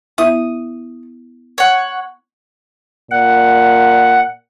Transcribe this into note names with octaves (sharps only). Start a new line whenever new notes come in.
B3 E4 E5 D#6
C#5 F#5
A#2 F#5